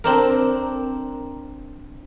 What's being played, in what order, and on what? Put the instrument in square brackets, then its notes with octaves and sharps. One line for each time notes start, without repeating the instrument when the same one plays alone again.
[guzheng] C4 D4 A#4